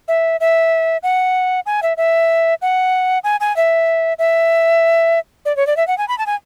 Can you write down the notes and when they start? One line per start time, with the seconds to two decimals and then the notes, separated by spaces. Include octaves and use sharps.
0.08 E5
0.40 E5
1.03 F#5
1.66 G#5
1.83 E5
1.97 E5
2.62 F#5
3.24 G#5
3.40 G#5
3.56 E5
4.19 E5
5.45 D5
5.57 C#5
5.67 D5
5.77 E5
5.88 F#5
5.98 G#5
6.08 B5
6.18 A5
6.26 G#5